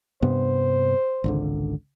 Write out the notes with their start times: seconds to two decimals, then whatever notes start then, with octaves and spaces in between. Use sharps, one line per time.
0.22 G2 C3 B3 C5
1.24 G#1 C#2 D3